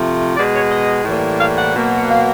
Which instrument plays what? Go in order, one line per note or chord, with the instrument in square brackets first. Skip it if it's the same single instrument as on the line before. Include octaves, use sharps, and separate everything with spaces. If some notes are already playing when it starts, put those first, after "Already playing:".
Already playing: [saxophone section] C3 F3 A3
B2 G#3 D5
C#5
D#5
A2 E3 G3 A#3
F5
F#5
B2 F#3 A#3
F#5
F5